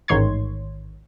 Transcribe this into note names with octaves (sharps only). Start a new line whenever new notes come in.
A1 G#2 D#3 C#5 C6 G#6